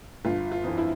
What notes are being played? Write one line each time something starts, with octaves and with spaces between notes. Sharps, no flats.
G1 F4
F4
F2 E3
E4